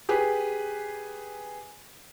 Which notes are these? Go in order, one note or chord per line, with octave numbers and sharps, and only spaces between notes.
G4 G#4 B4